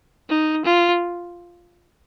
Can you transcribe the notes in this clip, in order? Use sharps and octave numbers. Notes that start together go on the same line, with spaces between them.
D#4
F4